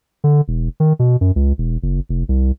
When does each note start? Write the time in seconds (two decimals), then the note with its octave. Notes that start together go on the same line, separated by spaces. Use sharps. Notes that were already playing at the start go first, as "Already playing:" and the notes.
0.24 D3
0.48 E1
0.80 D#3
0.99 B2
1.21 F#2
1.36 C#2
1.58 E1
1.83 F#1
2.09 F1
2.29 C2